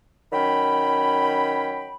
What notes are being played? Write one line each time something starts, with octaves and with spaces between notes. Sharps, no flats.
D#3 F#3 C#4 G5 B5